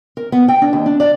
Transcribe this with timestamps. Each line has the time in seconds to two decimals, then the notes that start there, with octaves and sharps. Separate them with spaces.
0.17 A#4
0.32 B3
0.48 G5
0.62 D4
0.73 D#2
0.86 D4
1.00 D5